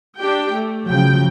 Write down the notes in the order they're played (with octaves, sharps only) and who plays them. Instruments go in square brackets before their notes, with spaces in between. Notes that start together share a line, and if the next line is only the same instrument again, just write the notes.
[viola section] D4 G4 G5
A3
[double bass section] C#3 F3 F#3 [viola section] G5